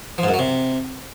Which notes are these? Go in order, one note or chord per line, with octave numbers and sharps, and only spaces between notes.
F3
G#2
F#2
F#3
C3